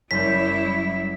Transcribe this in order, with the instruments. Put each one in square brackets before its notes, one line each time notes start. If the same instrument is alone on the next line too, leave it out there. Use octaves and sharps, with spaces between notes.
[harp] F#1 C#4 G6 [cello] G3 E4 [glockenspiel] B6